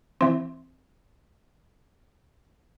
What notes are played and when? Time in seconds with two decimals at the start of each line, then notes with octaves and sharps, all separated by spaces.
0.21 E3 C4